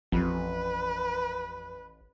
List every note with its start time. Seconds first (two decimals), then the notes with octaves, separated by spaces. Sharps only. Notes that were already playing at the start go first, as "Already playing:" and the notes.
0.12 A1 F2 B4